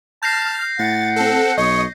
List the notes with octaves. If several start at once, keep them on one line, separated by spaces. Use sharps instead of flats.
A5 F6 G6 A#6 C7
A2 F#5 A6
C4 A4
B1 C#5 D#5